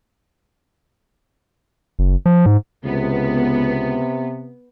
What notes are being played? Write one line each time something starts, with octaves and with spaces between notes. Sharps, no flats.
F#1
F3
G#2
C#2 C3 B3